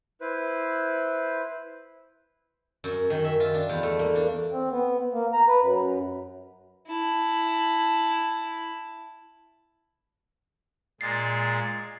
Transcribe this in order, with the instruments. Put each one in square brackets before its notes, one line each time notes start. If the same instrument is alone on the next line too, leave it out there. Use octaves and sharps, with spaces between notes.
[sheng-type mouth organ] E4 B4 C5
[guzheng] F#2
D#3
E5
F4
D4
E2
A3
A#3
D4
[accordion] C4
B3
A#3
A#5
B4
F#2
[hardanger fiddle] E4 A5
[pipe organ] A#2 G#3 [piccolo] A6 [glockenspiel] C7